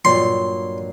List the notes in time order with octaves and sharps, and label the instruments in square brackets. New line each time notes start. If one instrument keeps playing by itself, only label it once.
[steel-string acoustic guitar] G2 A#2 F#3 [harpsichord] C6